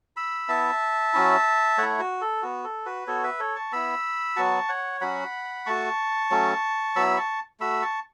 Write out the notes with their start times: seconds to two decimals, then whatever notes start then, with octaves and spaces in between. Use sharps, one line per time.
0.16 B5 E6
0.48 B3 E4 E5 A5
1.14 F#3 C#4 E4
1.78 A3 E4 C#5 F#5
1.99 F#4
2.21 A4
2.42 B3 F#4
2.64 A4
2.86 F#4 B4
3.07 B3 F#4 A4 C#5
3.24 B4 E5
3.39 A4 C#5
3.55 A5 C#6
3.72 B3 E4 B5 E6
4.36 F#3 B3 F#4 A5 C#6
4.69 C#5 F#5
5.01 F#3 C#4 F#4 F#5 B5
5.66 A3 F#4 A5 C#6
6.31 F#3 A3 C#4
6.96 F#3 B3 E4 B5 E6
7.17 A5 C#6
7.60 A3 F#4 B5 E6
7.82 A5 C#6